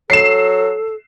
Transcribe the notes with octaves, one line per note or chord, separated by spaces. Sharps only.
F#3 A4 C7 E7